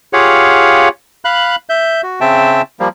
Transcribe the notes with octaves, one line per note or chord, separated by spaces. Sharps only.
F4 G4 G#4 C#5 F5 F#5
F5 B5 F#6
E5 G6
F#4
C#3 C4 E5 G5 A5
F3 G3 A#3